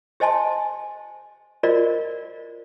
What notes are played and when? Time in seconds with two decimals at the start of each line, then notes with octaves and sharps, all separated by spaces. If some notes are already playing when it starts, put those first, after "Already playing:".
0.20 G4 C5 D#5 G#5 A5 C6
1.63 F4 F#4 A#4 C5 D5 D#5